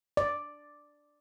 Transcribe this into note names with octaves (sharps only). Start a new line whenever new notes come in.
D5